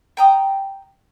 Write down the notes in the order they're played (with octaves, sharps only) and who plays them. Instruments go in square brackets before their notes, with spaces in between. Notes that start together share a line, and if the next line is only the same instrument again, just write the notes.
[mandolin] G5 A#5 D#6